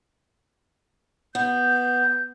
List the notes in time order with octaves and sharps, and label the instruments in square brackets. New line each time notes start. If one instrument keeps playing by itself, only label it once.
[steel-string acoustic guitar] B3 [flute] G6